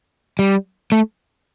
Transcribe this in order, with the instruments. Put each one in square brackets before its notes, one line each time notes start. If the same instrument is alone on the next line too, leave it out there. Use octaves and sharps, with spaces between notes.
[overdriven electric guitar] G3
A3